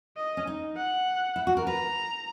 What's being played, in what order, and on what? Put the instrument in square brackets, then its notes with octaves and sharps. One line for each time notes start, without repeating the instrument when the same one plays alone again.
[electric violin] D#5
[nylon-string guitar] C#4
D#4
[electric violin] F#5
[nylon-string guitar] E4
F#4
A#4
[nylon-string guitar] B4 [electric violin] A#5